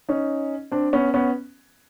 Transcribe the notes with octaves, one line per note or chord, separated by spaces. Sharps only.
C#4 D#4
C4 D4
B3 C#4
B3 C#4